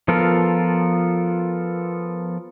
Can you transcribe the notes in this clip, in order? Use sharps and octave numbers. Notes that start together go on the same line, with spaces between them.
F3 B3 F4 A4 A#4